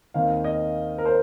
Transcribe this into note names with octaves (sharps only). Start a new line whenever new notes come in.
D#2 D#3 C4 F5
D#5
A#4
C5